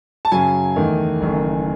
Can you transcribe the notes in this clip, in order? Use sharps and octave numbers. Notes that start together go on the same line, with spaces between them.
A5
F#2 C#3 F#3 G#5
E2 D#3 A3
F#1 F#2 D#3 A3